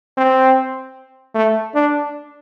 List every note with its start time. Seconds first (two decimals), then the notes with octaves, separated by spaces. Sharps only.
0.18 C4
1.35 A3
1.75 D4